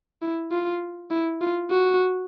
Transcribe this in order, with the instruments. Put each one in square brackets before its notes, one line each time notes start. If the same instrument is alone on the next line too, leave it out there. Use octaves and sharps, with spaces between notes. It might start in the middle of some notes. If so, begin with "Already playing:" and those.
[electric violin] E4
F4
E4
F4
F#4